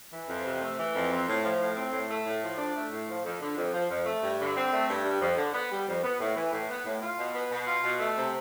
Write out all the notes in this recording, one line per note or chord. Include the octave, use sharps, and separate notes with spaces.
E3
F2
C3
A3
E3
F2
C4
A2
F3
A2
C4
A2
A3
A2
F3
D4
A3
A2
F3
F2
D3
F2
F3
F2
A3
G2
D3
C4
A3
G2
G3
F2
D3
B3
G3
F2
B3
A2
E3
A2
B3
A2
F4
B2
B3
B2
F4
B2
A3
C3